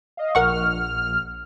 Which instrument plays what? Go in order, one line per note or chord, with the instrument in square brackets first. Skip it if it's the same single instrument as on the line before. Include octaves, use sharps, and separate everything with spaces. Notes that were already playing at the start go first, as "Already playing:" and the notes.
[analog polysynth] D#5 F5
[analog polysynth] A#1 F6 [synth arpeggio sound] A#4 F#5 C#6